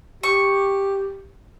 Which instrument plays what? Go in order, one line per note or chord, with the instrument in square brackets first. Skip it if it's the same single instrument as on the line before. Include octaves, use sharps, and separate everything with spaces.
[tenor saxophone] G4 [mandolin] C#6